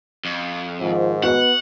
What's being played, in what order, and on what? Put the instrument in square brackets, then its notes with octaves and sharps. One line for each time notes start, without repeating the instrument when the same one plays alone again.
[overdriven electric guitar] F2
[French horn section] G#2 D#3 [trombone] F3
[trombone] B3 [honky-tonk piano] F#4 D#5 [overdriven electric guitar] F#5